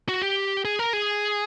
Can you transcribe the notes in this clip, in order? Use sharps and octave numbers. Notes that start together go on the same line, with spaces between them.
F#4
G4
G#4
A#4
G#4